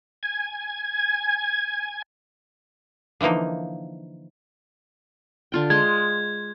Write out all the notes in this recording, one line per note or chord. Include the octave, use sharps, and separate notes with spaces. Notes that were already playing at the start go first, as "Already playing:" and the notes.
G#5 G#6
D3 E3 F3 A#3 D#4
D3 F4 G5
G#3 C6 G#6